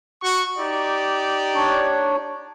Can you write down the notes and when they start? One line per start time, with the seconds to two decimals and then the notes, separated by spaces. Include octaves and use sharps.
0.23 F#4 C#6
0.59 D#4 G4 D5
1.55 D4 C#5